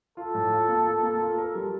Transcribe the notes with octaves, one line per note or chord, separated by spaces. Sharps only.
F4 A4
A2
F4
A#3
F4
A#3
F4
A#4
G3